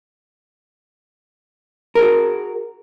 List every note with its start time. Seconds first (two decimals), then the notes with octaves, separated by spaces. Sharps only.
1.95 A#4
1.99 G#4
2.02 F#4